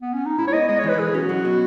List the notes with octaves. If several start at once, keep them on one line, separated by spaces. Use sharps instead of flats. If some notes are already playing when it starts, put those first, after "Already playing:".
B3
C#4
D#4
G#2 E4
C#5
B3 D#5
G#3 D#5
C#5
E3
B4
B1 G#4
C#4 F#4
F#3
B2